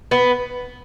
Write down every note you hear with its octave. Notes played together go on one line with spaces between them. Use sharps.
B3